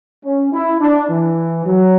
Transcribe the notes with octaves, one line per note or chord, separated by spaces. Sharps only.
C#4
E4
D4
E3
F#3